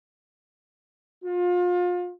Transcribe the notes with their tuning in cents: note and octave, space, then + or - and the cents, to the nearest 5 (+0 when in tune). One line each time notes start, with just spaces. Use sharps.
F4 +30